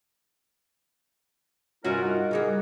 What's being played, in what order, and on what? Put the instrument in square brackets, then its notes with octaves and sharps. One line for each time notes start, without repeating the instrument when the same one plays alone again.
[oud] G2 C3 D#5 [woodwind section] C#4 A#4 [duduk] F4 [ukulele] F#4
[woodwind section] D#4 A#4 F#5
[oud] C#3 G3 A#3 [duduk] G#4